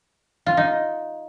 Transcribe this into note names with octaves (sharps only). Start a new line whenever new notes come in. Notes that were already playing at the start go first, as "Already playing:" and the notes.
F4
D#4